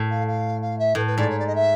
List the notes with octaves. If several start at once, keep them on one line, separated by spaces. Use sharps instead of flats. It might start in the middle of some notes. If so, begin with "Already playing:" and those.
Already playing: A2
F5
F5
F5
E5
A2 B4
B4
G#2 D5
C#5
D5
D#5
E5